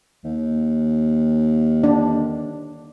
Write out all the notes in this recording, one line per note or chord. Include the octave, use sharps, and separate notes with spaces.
D#2
D4